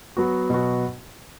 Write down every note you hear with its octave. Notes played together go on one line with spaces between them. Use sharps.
F#3 B3 F#4
B2 F#3 B3 F#4